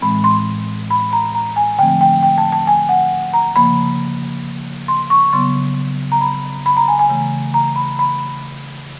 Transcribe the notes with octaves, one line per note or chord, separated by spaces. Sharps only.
A2 E3 G#3 C4 B5
C6
B5
A#5
A#5
G#5
D3 F3 A3 C4 G5
G5
G5
A5
A5
G#5
F#5
A#5
C#3 F3 A#3 B5
C6
C#6
C#3 F#3 B3 C6
A#5
B5
B5
A#5
G#5
G#5
C#3 E3 A3
A#5
B5
B5